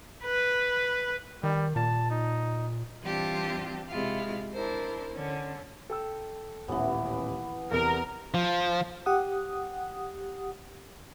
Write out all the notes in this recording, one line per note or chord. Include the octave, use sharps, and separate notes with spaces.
B4
D#3 G3
A#2 A5
D#4
E3 G3 C4 D4 F4 G4
C3 G#3 E4 F4
D4 E4 A#4 C5
D3 C#4
A4 G5 E6
D#1 A1 E3 B3
E2 C3 A#4
F3
G4 F#5 D#6